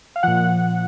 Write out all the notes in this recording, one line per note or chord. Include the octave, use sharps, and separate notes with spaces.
F5
A#2 F3 F#5